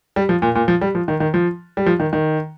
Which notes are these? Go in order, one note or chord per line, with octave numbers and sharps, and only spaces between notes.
G3
F3
A#2
A#2
F3
G3
F3
D#3
D#3
F3
G3
F3
D#3
D#3